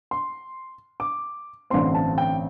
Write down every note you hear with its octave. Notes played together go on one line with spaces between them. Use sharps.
C6
D6
A1 G2 D3 A3 C4 C6
A5
G5